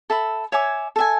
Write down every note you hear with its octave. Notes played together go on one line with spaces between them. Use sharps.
A4 E5 B5
C#5 E5 G#5 D6
A4 E5 G#5